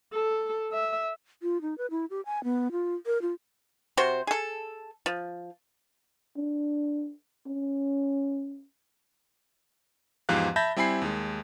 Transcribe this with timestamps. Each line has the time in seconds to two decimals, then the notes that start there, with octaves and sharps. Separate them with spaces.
0.13 A4
0.72 E5
1.43 F4
1.61 D#4
1.78 B4
1.91 E4
2.10 G4
2.26 G#5
2.44 B3
2.72 F4
3.06 A#4
3.22 F4
3.97 C3 F#4 C5
4.27 G#4 A4
5.06 F3
6.36 D4
7.47 C#4
10.29 E2 G#2 F3 G4 F5 F#6
10.56 E5 A5 B5 G6 A6 A#6
10.76 G3 C4 E4 G#5 B5 C7
11.02 D#2 G#3